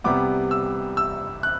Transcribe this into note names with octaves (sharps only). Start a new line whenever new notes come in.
C2 C3 G3 B3 D6
E6
E6
F#6